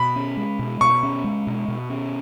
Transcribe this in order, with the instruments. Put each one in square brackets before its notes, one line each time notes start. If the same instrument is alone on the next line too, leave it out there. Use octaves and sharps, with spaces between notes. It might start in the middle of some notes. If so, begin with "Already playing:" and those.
Already playing: [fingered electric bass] B2 [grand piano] B5
[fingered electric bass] C#4
G#3
B2
[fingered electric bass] B2 [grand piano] C#6
[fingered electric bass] C#4
G#3
B2
B2
C#4